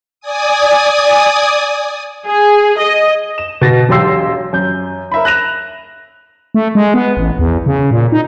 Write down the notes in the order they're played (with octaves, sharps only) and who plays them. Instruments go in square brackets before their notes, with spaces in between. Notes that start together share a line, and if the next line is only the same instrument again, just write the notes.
[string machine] D5 G#5 D#6
[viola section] G#4
D#5
[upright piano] E7
B2 A6 A#6
E1 B1 G4 C6 E6 C7
F#2 G6
A#4 E5 B5
F#6 A#6 E7 F7
[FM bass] A3
G#3
B3
A1
E2
C#3
A#2
D#4